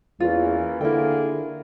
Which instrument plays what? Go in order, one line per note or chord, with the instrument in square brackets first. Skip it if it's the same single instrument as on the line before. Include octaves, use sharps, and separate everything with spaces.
[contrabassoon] E2 [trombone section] E3 A#3 C#4 [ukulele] F4
[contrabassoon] D3 [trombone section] A#3 F4 G#4 [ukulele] E4 G5